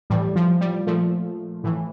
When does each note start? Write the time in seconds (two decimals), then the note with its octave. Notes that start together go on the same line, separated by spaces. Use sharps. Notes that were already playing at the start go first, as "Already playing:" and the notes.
0.10 A2 E3 G3
0.36 F3
0.61 G3
0.87 A#2 F3 A3
1.64 A2 E3